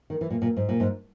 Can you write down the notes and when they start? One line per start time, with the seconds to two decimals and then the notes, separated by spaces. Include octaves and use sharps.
0.10 D#3
0.21 E3
0.30 A#2
0.42 A#2
0.57 G#2
0.69 A#2
0.80 G#2